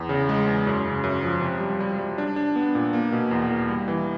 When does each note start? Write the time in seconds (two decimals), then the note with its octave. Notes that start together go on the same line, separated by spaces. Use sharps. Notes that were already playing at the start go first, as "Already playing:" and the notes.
Already playing: E2
0.09 C#3
0.29 G#3
0.47 E2
0.67 F#2
0.85 C#3
1.04 F#2
1.23 F3
1.41 C3
1.60 G3
1.80 G3
1.99 G3
2.18 D4
2.36 D4
2.56 B3
2.75 A#2
2.93 A#3
3.12 B2
3.31 E2
3.51 A#3
3.69 G3
3.88 E3